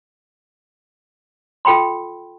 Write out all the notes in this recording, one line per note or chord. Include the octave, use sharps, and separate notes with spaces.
F4 A4 G5 B5 C6